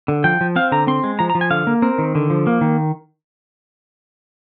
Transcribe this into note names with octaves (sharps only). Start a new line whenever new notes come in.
D3
F3 G5
F3
C4 F5
D3 A#5
C4 C6
G#3
F3 A#5
A#5
F3
G#5
D3 F5
A#3
C4 A#4
D#3
D3
F3
A#3
D#3